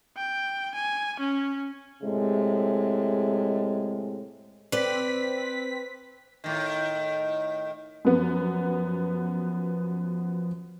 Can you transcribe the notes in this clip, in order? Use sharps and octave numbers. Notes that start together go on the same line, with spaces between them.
G5
G#5
C#4
A2 C3 G#3
C4 B4 D5 B6
A2 D#3
F#2 F3 B3